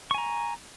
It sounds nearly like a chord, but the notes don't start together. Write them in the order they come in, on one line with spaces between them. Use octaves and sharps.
C#6 G#5 A#5